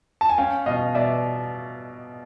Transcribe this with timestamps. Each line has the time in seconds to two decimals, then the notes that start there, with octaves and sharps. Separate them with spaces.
0.21 A5
0.29 G#5
0.38 C#4 F5 G5
0.66 B2 D#5 F5
0.95 B2 D5 E5